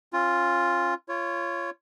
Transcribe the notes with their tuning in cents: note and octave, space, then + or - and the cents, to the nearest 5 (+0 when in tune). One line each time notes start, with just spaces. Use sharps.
C#4 -40 F4 +0
F4 -25 C#5 +0